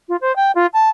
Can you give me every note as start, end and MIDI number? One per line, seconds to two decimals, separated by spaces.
0.09 0.16 65
0.21 0.35 72
0.36 0.51 79
0.55 0.66 65
0.73 0.89 81